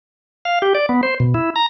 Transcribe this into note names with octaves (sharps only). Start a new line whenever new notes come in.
F5
G4
D5
B3
C5
B2
E4
A#5